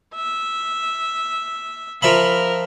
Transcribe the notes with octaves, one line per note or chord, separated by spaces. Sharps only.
E5
F3 A#4 E5 B5